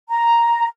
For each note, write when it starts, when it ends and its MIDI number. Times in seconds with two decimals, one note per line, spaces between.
0.10 0.66 82